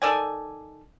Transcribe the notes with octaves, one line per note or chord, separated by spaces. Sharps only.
D#3 A4 D5 G#5